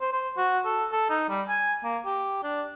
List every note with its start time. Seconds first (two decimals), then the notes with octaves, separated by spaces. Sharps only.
0.01 C5
0.13 C5
0.37 F#4
0.65 A4
0.92 A4
1.09 D#4
1.29 G3
1.49 G#5
1.84 A#3
2.06 G4
2.43 D4